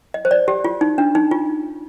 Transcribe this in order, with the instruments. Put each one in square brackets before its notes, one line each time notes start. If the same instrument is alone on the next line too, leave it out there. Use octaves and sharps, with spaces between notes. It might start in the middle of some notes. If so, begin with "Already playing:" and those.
[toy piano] D#5
C5
D5
G4
F4
D#4
D4
D#4
F4